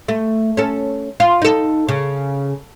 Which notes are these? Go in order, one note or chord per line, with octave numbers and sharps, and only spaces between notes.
A3
C#4 A4
F4
D#4 A4
C#3